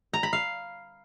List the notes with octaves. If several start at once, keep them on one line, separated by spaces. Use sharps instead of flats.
A#5
B5
F5